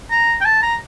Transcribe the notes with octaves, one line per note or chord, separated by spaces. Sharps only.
A#5
G5
A5
A#5